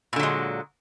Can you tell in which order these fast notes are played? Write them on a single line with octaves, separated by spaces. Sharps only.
A#2 D3 F#3 G#3